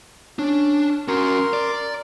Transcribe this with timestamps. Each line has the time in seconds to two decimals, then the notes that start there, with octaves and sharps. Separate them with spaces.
0.39 C#4 D4
1.08 C#4 F#4 A#4 C6
1.53 D5